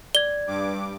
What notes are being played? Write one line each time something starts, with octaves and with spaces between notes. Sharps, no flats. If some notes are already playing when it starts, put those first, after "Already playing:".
D5 G#6 G7
G2 D6